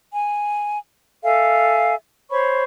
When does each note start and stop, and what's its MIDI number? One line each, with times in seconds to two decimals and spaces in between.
0.13 0.80 80
1.23 1.94 69
1.23 1.94 76
1.23 1.94 77
1.23 1.94 80
2.30 2.63 72
2.30 2.63 73
2.30 2.63 83
2.30 2.63 85